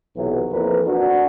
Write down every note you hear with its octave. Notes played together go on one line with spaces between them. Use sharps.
B1 C3 E3 F#3
F2 E3 A#3 A#4 B4
D4 F#4